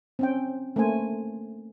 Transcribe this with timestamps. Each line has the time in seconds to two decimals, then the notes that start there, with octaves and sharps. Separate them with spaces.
0.19 C4 C#4 G5
0.76 A3 A#3 C#4 C5 G#5